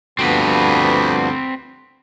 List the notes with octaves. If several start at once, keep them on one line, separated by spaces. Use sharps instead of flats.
D2 G2 F3 B3 C4 B4